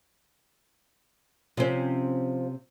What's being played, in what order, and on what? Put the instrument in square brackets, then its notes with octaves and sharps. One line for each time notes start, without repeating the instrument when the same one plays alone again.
[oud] C3 C#4 [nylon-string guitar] F3 C5